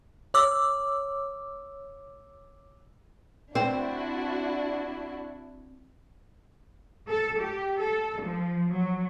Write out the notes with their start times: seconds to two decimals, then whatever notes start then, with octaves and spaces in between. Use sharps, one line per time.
0.34 C#5 D6 E6
3.55 C4 D4 E4 F#4
7.10 A4
7.40 G4
7.79 A4
8.22 F3
8.72 F#3